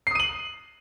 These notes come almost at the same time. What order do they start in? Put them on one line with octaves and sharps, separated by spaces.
C7 D#6 D#7 F#7